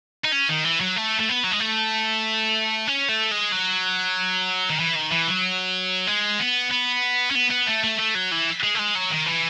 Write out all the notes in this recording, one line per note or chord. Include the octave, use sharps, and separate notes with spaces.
D#4
C#4
D#3
E3
F#3
A3
A3
B3
F#3
G#3
A3
C#4
A3
G#3
F#3
D#3
E3
D#3
E3
F#3
G#3
B3
B3
C#4
B3
B3
A3
A3
A3
F#3
E3
G#3
A3
G#3
F#3
D#3
E3